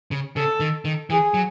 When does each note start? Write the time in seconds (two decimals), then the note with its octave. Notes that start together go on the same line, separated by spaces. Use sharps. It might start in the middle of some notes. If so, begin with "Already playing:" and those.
0.11 C#3
0.36 C#3 A4
0.60 D#3
0.85 D#3
1.10 E3 G#4
1.34 F#3